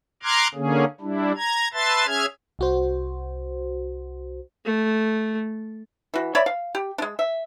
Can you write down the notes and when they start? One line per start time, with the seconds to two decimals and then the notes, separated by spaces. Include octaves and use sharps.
0.23 A#5 C6 D6 F6 F#6 G#6
0.54 D3 A#3 C#4 G#4
1.01 G3 D4 E4
1.36 A#5 G#6
1.73 B4 E5 A5 C6 A6
2.06 C#4 G#4 E5 F6 G#6
2.59 C2 F#4 C5
4.65 A3
6.14 E3 F#4
6.35 C#5 D5 E5 B5
6.46 F5
6.75 G4
6.98 G#3 D4
7.19 E5